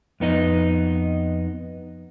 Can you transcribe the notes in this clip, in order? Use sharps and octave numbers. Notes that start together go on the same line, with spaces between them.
F2 B3 D#4 D#5